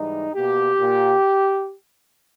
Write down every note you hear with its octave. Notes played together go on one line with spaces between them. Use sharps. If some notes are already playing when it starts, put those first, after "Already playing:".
Already playing: G#2 E3 G3 D#4
B2 A#3 G4
A#2 A#3